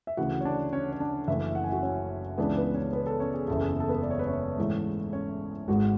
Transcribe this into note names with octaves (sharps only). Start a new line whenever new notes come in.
E5
D2 C#3 E3 F#4 F#5
C#5
D4 D5
C#4 C#5
C#5
D4 D5
F#1 F#2 E3 A3 E4 E5
F#5
G#5
F#4 F#5
C#4 C#5
C#2 C#3 E3 B3 D4 B4
B3 B4
C#4 C#5
B3 B4
A4
C#4 C#5
G#4
F#1 E2 C#3 A4
G#4
A4
B3 B4
D5
C#5
B4
C#4 C#5
G#2 E3 A3
C#4 C#5
G#1 G#2 G#3 F#4 F#5